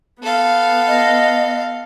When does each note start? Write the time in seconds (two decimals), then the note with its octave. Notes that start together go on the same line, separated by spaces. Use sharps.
0.22 B3 A4 F5
0.87 D#5